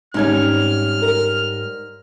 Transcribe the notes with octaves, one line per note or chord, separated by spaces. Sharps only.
G#1 G#2 G3 C#4 F6 G#6
A#4